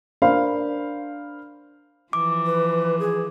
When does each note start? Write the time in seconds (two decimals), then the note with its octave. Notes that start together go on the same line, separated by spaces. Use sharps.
0.22 D4 A#4 C5 F5 B5
2.13 E3 F3 D6
2.46 B4
2.99 G#4